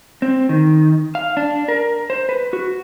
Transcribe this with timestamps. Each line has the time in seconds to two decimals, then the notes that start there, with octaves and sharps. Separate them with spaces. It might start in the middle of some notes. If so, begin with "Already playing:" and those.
0.22 C4
0.49 D#3
1.15 F5
1.37 D4
1.68 A#4
2.10 C5
2.29 B4
2.53 F#4